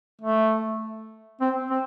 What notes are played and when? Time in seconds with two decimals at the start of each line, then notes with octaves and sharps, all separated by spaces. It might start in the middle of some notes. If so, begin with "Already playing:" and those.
0.21 A3
1.41 C4
1.70 C4